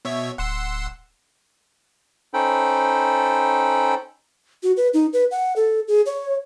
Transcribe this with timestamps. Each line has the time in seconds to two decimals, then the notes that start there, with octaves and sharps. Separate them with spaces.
0.05 B2 C#5 E5
0.38 D1 F#5 C6 E6
2.34 C#4 D#4 A4 C5 G5 B5
4.63 F#4
4.77 B4
4.94 D#4
5.13 B4
5.31 F#5
5.56 A4
5.88 G#4
6.06 C#5